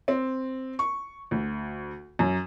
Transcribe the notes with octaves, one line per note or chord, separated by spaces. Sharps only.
C4
C#6
D2
F#2